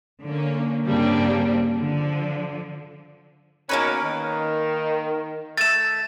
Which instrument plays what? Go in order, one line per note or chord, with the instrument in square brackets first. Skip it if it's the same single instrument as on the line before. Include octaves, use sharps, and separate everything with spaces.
[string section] D3 A#3 C#4
G2 C#3 G3 A#3 C4 D4
D3 F3
[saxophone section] B2 D#3 C#4 [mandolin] A#3 A#4 B4
[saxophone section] D#3
[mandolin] A3 E5 [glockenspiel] A6 E7